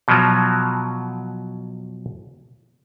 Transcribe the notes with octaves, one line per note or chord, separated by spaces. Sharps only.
B2 F3 F#3